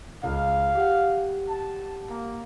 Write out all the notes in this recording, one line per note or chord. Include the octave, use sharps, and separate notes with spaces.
C#2 F5
G4 F#5
A5
A#3